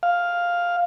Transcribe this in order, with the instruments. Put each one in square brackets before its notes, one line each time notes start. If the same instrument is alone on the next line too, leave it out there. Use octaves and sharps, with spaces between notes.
[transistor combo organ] F5